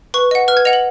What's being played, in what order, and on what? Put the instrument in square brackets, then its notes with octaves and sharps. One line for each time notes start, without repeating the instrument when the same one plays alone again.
[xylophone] B4 C#6
D#5 F#5
B4 F6
G#6
D#5 F#5 F7
F#7